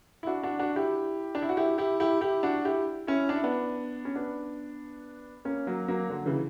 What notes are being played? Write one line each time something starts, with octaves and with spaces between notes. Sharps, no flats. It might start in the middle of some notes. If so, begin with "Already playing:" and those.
E4
D4 F#4
D4 F#4
D4 F#4
E4 G4
D4
E4
F#4
E4 G4
E4 G4
E4 G4
E4 G4
D4 F#4
E4 G4
C#4 E4
D4
E4
B3 D4
C#4
B3 D4
A#3 C#4
F#3 A#3
F#3 A#3
D3 F#3
C#3 E3